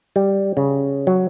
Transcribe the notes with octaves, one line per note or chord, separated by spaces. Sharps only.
G3
C#3
F#3